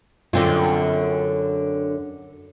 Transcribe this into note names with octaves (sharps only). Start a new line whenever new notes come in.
F#2 D3 C4 F4